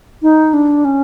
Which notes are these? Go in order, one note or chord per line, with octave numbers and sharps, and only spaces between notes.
D#4
D4
C#4